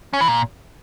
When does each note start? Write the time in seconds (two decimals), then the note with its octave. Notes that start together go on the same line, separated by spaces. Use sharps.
0.13 C#4
0.21 E3
0.28 A#2